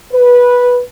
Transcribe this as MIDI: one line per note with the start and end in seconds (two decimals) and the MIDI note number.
0.12 0.79 71